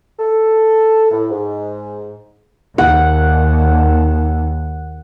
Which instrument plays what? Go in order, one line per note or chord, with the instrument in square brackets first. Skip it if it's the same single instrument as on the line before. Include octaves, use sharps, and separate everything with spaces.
[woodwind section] A4
A2
G#2
[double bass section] D#2 [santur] F#5